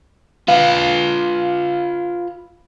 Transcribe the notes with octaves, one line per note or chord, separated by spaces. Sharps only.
F4 B4 F5